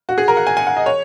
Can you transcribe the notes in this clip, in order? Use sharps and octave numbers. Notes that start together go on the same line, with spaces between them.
F#4
G#4
A#4
F#5
G#5
G#5
F#5
D#5
C#5